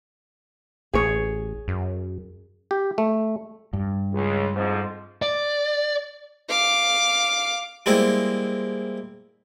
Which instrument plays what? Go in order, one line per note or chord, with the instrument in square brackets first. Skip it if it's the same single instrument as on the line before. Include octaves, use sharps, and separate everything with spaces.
[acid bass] A1 [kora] G#4 C#5
[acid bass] F#2
[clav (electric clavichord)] G4
A3
[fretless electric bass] G2
[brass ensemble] C#2
F2 G#2 F3
[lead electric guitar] D5
[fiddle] F5 D6
[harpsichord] G3 G#3 A#3 C4 E4